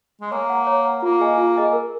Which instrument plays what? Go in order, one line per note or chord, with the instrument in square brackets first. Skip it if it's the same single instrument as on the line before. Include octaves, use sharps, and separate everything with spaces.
[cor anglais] G#3
[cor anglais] A#3 [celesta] C#5
[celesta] F#5 A#5
C#5
F#5 A#5
[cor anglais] A#3 [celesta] F4
[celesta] G#4 D#5 G#5
F4
G#4 D#5 G#5
A#4